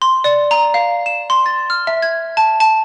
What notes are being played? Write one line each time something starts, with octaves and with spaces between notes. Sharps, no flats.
C6
D5
A#5
F5
E7
C6
A6
F6
E5
G#6
A5
A5